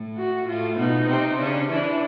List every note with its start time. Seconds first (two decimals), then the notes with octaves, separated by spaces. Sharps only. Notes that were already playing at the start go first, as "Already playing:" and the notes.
Already playing: A2 A3
0.17 F#4
0.47 A2 A3 F4
0.77 B2 B3 D#4
1.08 C3 C4
1.39 C#3 C#4 D4
1.69 E3 D4 E4